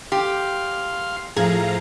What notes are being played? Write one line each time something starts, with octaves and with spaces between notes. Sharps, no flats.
G4 F5 C6
A2 F3 G#4 F5 A#5